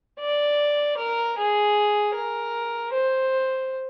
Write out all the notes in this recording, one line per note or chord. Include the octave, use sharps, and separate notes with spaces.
D5
A#4
G#4
A#4
C5